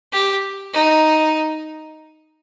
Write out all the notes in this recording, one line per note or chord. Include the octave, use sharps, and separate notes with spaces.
G4
D#4